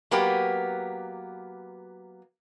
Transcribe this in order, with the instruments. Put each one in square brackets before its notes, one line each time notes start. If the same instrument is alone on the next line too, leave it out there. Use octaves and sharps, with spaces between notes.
[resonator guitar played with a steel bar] F#3 A#3 B3 G4